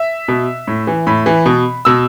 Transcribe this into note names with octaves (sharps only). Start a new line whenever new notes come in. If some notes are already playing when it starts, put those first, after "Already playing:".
Already playing: E5
B2
A2
E3
A2 B5
E3
B2
B2 E6